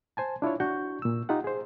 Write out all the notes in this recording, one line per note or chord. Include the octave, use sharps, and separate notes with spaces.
C5 G#5 A5
D4 E4 F4 C#5
D4 F#4 C#6 G6
A#2 E6
D#4 F4 G4 F#5
G#4 C5